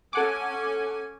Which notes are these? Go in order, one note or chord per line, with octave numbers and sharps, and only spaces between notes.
C#4 A4 F#5 G#5 D6